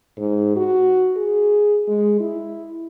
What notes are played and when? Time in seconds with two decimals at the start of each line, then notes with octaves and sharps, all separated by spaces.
0.18 G#2
0.56 F#4
1.16 G#4
1.88 G#3
2.20 E4